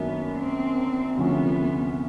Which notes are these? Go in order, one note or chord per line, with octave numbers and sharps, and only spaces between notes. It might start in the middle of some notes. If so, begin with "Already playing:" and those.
Already playing: F#2 D#3 F#3 A#3 B3 D4
C4
D2 C3 F3 A3 B3 C#4